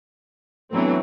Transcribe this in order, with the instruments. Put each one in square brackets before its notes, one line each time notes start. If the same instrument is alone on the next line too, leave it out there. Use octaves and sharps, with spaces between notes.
[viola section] E3 F#3 C4 [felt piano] A3 B3 D4